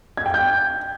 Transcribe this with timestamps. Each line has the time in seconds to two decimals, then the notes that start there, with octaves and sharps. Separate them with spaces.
0.17 G#6
0.26 G5
0.34 G6